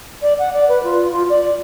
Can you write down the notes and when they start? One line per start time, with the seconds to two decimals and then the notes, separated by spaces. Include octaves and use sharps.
0.22 D5
0.39 F#5
0.53 D5
0.68 B4
0.83 F4
1.12 F4
1.30 D5